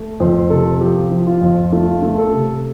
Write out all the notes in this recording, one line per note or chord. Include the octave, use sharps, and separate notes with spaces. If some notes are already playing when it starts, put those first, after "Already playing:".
Already playing: A3
F2 C5
C3 A4
F3 G4
F3
F4
F2
A3 F4
A3
A4
C3